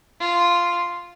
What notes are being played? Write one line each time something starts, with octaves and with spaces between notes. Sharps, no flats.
F4